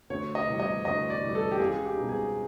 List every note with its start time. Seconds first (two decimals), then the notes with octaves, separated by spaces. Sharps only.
0.10 D2 C#5
0.35 D#5
0.47 C3 E3 G3
0.60 D#5
0.85 D2 D#5
1.10 D5
1.22 C3 E3 G3
1.35 A4
1.52 G4
1.60 C#2 G#4
1.85 G4
1.97 B2 G3 C4 D#4
2.09 G#4